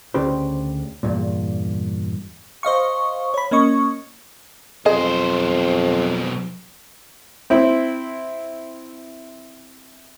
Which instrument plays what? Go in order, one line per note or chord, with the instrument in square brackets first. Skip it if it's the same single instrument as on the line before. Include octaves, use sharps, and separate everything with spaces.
[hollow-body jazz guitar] D2 C#3 G4 B4 C5
E2 G2 A#2
[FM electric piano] C5 D#5 F5 C#6
C#5 B5
A#3 C#4 D#5 C#6
[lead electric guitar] B1 C5 [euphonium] F2 [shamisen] G#4 D#5
[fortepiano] C4 E4